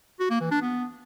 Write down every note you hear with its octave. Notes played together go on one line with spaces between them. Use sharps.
F#4
A#3
E3
D4
B3